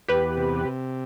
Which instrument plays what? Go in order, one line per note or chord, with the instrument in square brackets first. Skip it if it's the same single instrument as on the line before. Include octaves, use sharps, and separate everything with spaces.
[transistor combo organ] E2 [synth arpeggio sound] G4 B4
[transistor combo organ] C3
C3